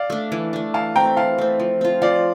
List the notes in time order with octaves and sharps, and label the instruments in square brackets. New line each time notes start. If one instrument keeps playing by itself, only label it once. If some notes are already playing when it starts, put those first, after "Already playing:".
Already playing: [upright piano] D5 F5
[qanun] A3 D4
E3
A3 D4
[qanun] E3 [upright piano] F5 A5
[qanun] A3 C4 [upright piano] G5 A#5
[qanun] E3 [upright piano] F5 A5
[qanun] A3 C4
F3
C4 F4
[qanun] F3 [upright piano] D5 F5